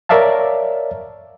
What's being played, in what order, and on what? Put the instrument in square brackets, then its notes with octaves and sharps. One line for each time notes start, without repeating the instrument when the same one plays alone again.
[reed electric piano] A#4 C#5 D5 E5 F5 A5